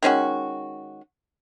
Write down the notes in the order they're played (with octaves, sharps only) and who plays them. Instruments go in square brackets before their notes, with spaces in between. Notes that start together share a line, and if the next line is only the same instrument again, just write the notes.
[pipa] D#3 G#3 C#4 F#4